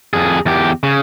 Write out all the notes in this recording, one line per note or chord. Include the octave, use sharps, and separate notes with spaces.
F2 G#4
E2 G4
C#3